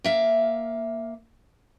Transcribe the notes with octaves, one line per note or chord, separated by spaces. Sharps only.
A#3 E5 F5